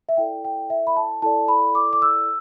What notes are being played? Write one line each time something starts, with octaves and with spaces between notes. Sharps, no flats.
E5
E4 A4 D5 G5
G5
E5
B5
A5
E4 A4 D5 A5
B5
D6
D6
E6